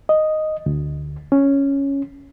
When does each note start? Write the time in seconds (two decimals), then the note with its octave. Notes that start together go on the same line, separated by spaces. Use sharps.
0.09 D#5
0.66 D2
1.32 C#4